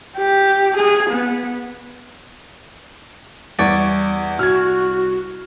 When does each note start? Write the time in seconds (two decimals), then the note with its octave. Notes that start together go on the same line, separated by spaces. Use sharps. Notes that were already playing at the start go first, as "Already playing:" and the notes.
0.18 G4
0.77 G#4
1.10 B3
3.59 E2 G3 C#5 D5
4.39 C2 F#4 F6 G#6